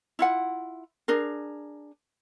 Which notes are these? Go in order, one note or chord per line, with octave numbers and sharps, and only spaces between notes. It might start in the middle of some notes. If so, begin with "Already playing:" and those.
E4 F4 F#5
D4 G#4 A#4